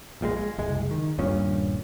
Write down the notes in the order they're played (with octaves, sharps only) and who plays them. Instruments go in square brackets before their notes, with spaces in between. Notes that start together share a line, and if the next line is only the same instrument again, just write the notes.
[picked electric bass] A#1 A#2 G3 G#3
G#3
F#1 C2 G#3
D#3
D#1 G2 A#2 C#4